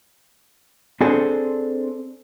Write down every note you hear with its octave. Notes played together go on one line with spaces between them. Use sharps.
C4 D4 G#4 A4 C5